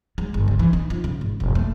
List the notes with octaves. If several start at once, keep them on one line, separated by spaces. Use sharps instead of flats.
G#3
G1
C#3
E3
D#4
F3
C#3
G#1
E1
A3